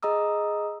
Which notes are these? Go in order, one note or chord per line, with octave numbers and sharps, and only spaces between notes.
G#4 D#5 A#5 D#6 E6